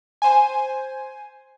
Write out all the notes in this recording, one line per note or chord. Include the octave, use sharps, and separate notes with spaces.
C5 G#5